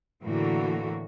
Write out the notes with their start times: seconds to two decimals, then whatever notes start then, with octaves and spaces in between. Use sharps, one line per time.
0.25 A2 D3 E3 A#3 F#4